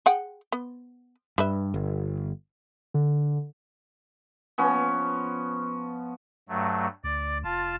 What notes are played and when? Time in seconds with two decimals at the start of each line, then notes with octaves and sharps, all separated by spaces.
0.06 G#4 F#5 G5
0.52 B3
1.38 G2 G3 B4 E5
1.74 G1
2.94 D3
4.58 F3 B3 C#4
6.49 G2 F#3 A3
7.04 D2 D5
7.44 F1 F4 A5